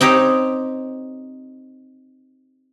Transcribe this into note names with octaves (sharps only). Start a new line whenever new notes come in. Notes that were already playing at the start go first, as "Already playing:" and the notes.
C4 D#4 G4 C#5